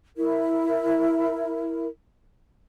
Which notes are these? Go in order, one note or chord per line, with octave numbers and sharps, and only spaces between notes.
E4 A#4